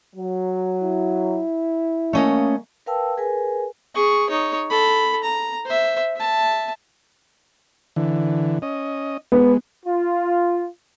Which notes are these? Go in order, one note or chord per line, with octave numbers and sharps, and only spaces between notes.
F#3
E4
A3 A#3 C#4 D#5
A#4 B4 F5 G5 A5 E6
G#4 A#4 B4 G#5
G#4 C#6
D#4 C#5
A4 B5
A#5
C5 E5
E5 A5
D3 E3
C#4 D#5
G#3 B3
F4